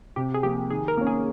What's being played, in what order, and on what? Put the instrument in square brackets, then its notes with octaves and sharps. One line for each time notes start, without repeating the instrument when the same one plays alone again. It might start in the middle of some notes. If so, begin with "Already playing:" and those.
[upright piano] C3 [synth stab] G4
[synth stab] G#4
[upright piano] F3 A#3 F4 [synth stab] G4
[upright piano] D#3 [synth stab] G#4
[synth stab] A#4
[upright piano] A#3 C#4
[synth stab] G#4